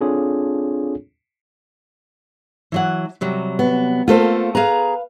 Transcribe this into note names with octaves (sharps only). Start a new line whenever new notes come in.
C4 D4 F4 G#4 A4 C#5
E3 F#3 F#5
C3 F#3 G3
B3
A3 A#3 F4 A4 C5
G#4 B4 F5 A#5